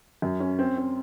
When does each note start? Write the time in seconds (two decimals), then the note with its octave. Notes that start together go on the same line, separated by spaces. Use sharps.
0.22 F#2
0.40 C#4
0.59 C4
0.77 C4